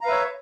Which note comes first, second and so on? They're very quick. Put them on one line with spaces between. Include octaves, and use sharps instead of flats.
A#5 F5 B4 E5 C#5